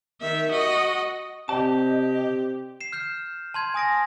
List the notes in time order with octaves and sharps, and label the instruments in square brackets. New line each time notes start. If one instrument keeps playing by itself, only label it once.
[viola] D#3 E5
F#4 D#5
[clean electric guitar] C3 D5 A5 [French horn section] C4 [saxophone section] G4 [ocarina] D#5
[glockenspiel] C7 E7
F6 G6 C7 E7
A5 C6 G#6
G#5 D#6 A#6 D7